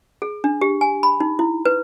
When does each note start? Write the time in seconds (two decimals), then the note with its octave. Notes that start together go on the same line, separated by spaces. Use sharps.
0.22 G#4
0.44 D4
0.61 G4
0.81 G#5
1.03 B5
1.20 D#4
1.39 E4
1.65 B4